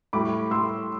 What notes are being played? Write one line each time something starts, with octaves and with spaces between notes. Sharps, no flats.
A2 G3 B5 D6
A2 G3 C6 E6